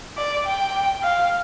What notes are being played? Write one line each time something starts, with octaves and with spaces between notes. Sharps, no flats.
D5
G5
F5